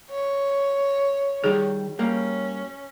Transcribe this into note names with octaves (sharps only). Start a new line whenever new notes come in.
C#5
D#3 G3 G#4
G3 A#3 C#4